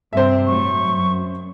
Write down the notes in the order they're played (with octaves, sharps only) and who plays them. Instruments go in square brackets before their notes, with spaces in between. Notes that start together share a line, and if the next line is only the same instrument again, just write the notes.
[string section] G2 C3 C4 [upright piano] C5 E5
[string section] A2 F#3 [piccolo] C#6
[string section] F#2